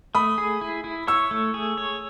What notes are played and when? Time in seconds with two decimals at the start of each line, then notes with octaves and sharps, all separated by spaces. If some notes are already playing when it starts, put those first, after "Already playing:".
0.15 A3 B5 D#6
0.38 G#4
0.61 E4
0.84 E4
1.07 C#5 C#6 E6
1.31 A3
1.54 G#4
1.78 C#5